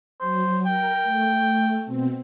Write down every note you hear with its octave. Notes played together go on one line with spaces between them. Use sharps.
F#3 C5
A#4 G5
A3
B2 C4